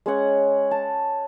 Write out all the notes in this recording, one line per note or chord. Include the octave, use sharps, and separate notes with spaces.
G#3 C#4 C#5 F#5
A5